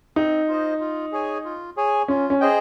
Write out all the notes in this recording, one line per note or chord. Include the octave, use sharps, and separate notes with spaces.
C4 D#4
F4 C5 D#5
F4
G#4 C#5 G#5
F4
G#4 C#5 G#5
C#4 F4
C#4
G#4 C5 D#5 G5